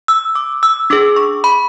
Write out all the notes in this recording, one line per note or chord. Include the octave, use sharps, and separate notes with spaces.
E6
D6
E6
D4 G#4 D6
C#6
B5